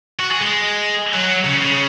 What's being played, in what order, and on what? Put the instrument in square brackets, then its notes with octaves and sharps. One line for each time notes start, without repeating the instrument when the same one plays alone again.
[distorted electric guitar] F#4
G#4
G#3
F#3
C#3
C#3